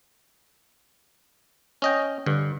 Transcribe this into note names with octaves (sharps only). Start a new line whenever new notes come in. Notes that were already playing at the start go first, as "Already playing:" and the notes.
C#4 D#5 G5
G2 D3